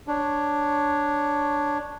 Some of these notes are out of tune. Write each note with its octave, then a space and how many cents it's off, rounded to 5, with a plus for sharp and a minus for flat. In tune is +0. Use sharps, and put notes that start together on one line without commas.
D4 +0 C#5 +0